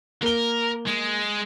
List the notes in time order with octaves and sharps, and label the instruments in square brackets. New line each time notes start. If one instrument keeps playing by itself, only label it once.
[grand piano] A#3 G7 [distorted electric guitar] A#4
[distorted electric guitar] G#3